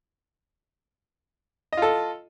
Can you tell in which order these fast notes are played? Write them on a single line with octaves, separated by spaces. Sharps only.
D#5 F4 A4